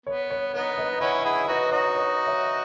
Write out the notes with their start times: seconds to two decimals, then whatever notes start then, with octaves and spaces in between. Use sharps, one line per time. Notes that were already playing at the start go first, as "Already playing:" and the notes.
0.06 B3 C#5
0.30 C#5
0.54 B3 D#4 C#5
0.78 B4 D#5
0.90 D#4
1.00 C#4 E4 D#5 F#5
1.24 E4 G#4 D#5 F#5
1.48 D#4 F#4 B4 D#5
1.72 D#4 F#4 C#5
1.96 C#5
2.27 C#5 E5